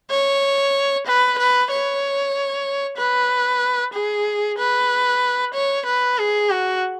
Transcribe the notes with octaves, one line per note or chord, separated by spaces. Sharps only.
C#5
B4
B4
C#5
B4
G#4
B4
C#5
B4
G#4
F#4